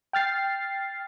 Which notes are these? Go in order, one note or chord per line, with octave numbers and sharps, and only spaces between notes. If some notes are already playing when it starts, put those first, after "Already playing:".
G5 F6 A6 C7